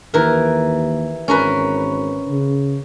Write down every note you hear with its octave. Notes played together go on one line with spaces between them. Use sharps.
D#2 E3 A#4
G#1 C#4 A#4 B4
C#3